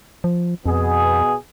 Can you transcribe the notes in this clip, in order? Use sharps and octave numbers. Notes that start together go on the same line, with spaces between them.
F3
F2 B2 B3 G#4